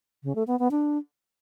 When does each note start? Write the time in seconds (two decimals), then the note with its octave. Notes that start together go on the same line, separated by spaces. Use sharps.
0.24 C#3
0.35 A3
0.47 B3
0.59 B3
0.71 D4